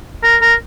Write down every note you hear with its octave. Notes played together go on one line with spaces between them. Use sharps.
A#4
A#4